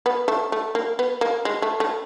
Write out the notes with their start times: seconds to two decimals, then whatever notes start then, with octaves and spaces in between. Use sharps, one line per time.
0.06 B3
0.28 A3
0.52 A3
0.75 A#3
0.99 B3
1.21 A#3
1.45 G#3
1.62 A3
1.80 A3